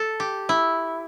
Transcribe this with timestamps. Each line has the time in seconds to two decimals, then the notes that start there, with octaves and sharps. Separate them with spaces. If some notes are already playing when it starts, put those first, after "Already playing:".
Already playing: A4
0.20 G4
0.49 E4